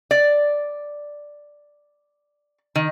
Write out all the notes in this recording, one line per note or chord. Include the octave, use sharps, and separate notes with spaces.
D5
D#3